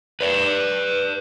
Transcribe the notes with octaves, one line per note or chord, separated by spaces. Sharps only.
B4 D5